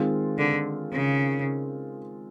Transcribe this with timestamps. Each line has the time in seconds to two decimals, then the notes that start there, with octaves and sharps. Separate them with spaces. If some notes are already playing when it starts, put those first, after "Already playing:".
Already playing: D#3 G#3 C4 F4
0.38 D3
0.92 C#3